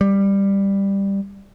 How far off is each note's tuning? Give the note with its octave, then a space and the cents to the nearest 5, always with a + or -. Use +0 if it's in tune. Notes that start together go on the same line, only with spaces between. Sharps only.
G3 +10